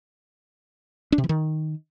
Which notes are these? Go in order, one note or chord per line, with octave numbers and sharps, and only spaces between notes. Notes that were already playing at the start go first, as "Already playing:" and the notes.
D4
C3
E3
D#3